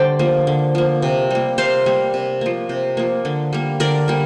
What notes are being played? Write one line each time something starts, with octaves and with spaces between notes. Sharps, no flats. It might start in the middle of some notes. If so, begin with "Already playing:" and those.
Already playing: D3 G3 C5 D5 G5
F3 A#3
D3
F3 A#3
C3
G3 A#3
C3 C5 F5
G3 A#3
C3
F3 A#3
C3
F3 A#3
D3
G3 A#3
D3 A#4 D5
G3 A#3